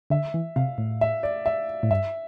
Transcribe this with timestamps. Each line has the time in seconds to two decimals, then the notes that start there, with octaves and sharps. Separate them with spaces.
0.10 D3 E5
0.34 E3
0.56 C3 F5
0.78 A2
1.01 E5
1.23 D5
1.46 E5
1.83 A2
1.90 G2 E5